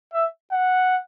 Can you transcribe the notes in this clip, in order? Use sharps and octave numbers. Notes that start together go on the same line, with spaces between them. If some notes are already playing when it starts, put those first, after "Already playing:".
E5
F#5